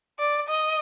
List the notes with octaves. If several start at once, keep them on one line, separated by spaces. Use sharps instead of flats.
D5
D#5